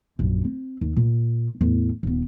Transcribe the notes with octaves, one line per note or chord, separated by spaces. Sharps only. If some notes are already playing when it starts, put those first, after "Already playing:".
A#1 F#2
C4
D#2
A#2
E2 A2
D#1 B3